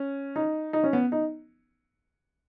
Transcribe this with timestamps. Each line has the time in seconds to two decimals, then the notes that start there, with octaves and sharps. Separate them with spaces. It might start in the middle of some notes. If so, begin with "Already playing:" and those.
Already playing: C#4
0.36 D#4
0.73 D#4
0.84 C#4
0.93 B3
1.12 D#4